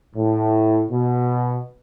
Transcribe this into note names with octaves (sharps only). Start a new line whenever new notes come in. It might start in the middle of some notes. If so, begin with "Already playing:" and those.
A2
B2